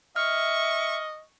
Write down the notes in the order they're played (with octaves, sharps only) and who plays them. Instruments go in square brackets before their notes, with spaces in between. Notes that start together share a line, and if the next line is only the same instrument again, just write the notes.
[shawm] D#5 [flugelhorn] E5 [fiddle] C#6 [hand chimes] F6